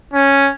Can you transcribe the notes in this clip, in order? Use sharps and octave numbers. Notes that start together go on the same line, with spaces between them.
C#4